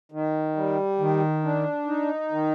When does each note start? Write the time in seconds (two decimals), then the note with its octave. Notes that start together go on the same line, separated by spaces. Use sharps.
0.12 D#3
0.56 G3
0.99 D#3
1.44 D4
1.87 D#4
2.32 D#3